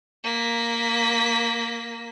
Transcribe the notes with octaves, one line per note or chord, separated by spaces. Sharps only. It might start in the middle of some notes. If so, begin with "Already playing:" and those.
A#3 B6